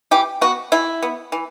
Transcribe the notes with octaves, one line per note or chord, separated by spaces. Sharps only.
E3 G4
B3 F#4
E3 E4
B3
E3